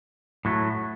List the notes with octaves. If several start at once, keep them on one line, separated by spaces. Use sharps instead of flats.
A2 F#3 A3